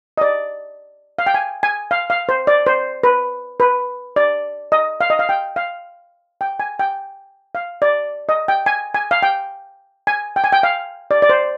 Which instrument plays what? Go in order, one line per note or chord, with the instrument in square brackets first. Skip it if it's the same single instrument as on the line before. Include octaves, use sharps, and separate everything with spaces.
[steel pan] D#5
D5
F5
G5
G#5
G#5
F5
F5
C5
D5
C5
B4
B4
D5
D#5
F5
D#5
F5
G5
F5
G5
G#5
G5
F5
D5
D#5
G5
G#5
G#5
F5
G5
G#5
G5
G#5
G5
F5
D5
D5
C5